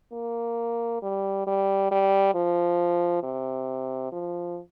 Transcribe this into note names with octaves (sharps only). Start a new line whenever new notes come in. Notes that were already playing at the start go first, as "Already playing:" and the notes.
A#3
G3
G3
G3
F3
C3
F3